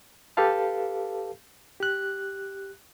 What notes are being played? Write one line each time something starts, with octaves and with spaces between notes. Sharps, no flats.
G4 A4 B4 F5 A5
G4 F#6